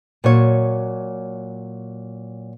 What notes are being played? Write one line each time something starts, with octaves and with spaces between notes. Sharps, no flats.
A#2 F#3 C#5